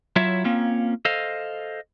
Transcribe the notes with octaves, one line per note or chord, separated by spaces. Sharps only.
F#3 E4 F4 C#5 E5
A#3 C4 C#4 F4
A4 C5 D#5 F5